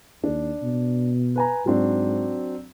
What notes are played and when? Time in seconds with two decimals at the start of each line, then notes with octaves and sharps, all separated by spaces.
0.24 D#2 D4
0.62 B2
1.36 B4 G#5 A#5
1.66 G#2 F#3 C4 D4